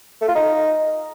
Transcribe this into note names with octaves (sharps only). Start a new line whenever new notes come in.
A3
F4
D#4